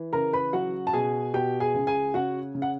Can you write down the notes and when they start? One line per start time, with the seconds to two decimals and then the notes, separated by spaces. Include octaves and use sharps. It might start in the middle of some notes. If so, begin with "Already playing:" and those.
Already playing: E3
0.13 C#3 A#4 A#5
0.33 B4 B5
0.53 F#3 F#4 F#5
0.87 A5
0.93 B2 G#4 G#5
1.34 B2 G4 G5
1.60 G#4 G#5
1.74 C#2
1.87 G#4 G#5
2.14 C#3 F#4 F#5
2.55 C#3
2.62 F#5